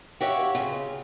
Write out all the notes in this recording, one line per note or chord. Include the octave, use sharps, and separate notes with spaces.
F#4 G4 C#5 E5 F5
C#3 F4